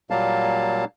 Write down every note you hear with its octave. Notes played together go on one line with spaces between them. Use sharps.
A#2 F#3 G3 A#3 F5 A5